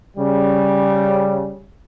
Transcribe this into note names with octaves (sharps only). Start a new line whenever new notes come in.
C#3 G3